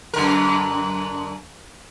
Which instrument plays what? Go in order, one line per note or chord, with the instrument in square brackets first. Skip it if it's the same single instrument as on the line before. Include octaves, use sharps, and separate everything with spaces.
[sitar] F#2 D3 A#4